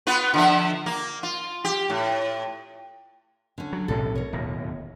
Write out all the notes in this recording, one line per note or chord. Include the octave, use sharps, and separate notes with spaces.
B3 F4 B4
D3 F3 E5
A#3
F4
G4
A2
D3 C#4
F#3
B1 A2 C3 A4
A#4 C#5
D1 D#2 B2